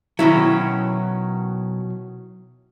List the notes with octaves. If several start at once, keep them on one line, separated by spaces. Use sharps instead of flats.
B2 D#3 F#3 C#4 E4